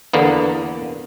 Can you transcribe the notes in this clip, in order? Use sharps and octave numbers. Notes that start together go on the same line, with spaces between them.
E2 D3 A#3 B3